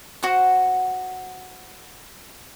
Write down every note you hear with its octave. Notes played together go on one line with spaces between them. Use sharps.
F#4 C5 F#5